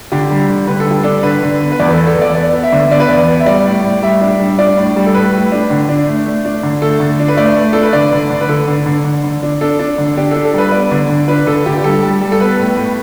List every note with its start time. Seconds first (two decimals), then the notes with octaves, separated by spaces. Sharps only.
0.12 D3 G4
0.31 G3
0.49 D3
0.67 D3 B4
0.80 A4
0.86 G3 G4
1.04 D4 A4
1.23 D3 B4
1.43 D3
1.61 B3
1.72 B4
1.80 E2 D5
1.88 B4
1.93 A4
1.98 B3
2.07 A4
2.17 E2
2.22 D5
2.35 B3 D5
2.53 B3
2.63 E5
2.72 D3
2.91 B3 D5
3.00 B4
3.09 E2 D5
3.28 B3
3.40 E5
3.46 G3 D5
3.65 A2
3.84 A2
4.02 G3 E5
4.21 D4
4.40 G3
4.58 D4 D5
4.77 A2
4.96 G3
5.06 A4
5.14 A2 B4
5.33 A2
5.52 D4
5.70 D3
5.89 D4
6.07 A3
6.26 A3
6.45 D4
6.63 D3
6.82 A3 A4
7.00 D3
7.20 D4
7.28 B4
7.37 A3 D5
7.56 A3
7.73 D4 A4
7.82 B4
7.93 D3 D5
8.13 D3
8.30 D3
8.41 B4
8.49 D3 A4
8.68 D3
8.86 D3
9.05 D3
9.24 D3
9.43 D4
9.61 D4 A4
9.79 D4
9.98 D3
10.17 D4 G4
10.31 A4
10.36 D4
10.45 A4
10.54 G3 B4
10.69 B4
10.72 B3 D5
10.91 D3
11.10 D3
11.28 D4 B4
11.46 D3 A4
11.66 D3 G4
11.78 G4
11.84 G3 A4
12.03 G3
12.21 G3
12.32 A4
12.41 B3 B4
12.59 A2
12.77 A2